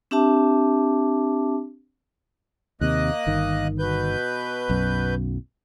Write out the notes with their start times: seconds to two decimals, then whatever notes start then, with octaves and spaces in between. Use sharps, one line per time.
0.11 C4 D4 G4 E5 A5 D6
2.81 D#2 C3 A#3 D#5 F#6
3.27 G1 D#3
3.79 B2 B4 G6
4.70 B1 F#2